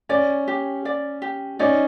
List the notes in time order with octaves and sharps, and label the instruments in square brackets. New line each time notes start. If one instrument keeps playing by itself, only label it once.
[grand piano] C#4 [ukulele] D5
[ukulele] G4
D5
G4
[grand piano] C#4 D#4 [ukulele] D5